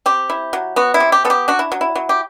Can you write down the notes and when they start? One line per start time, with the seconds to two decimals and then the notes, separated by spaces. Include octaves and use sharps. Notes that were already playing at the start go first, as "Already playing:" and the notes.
0.06 C4 G4
0.30 E4
0.53 F#3
0.76 B3 F#4
0.94 E4
1.00 C3
1.12 G4
1.25 B3 A4
1.30 G4
1.48 D4 F#4
1.59 E4
1.72 F#3
1.81 E4
1.96 F#3
2.09 G4